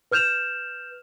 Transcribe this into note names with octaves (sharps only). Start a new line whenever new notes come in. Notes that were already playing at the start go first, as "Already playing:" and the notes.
B4 F6 G6 E7 F7